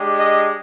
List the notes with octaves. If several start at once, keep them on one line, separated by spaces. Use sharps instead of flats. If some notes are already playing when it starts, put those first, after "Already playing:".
Already playing: G#3 D4 G4
D#5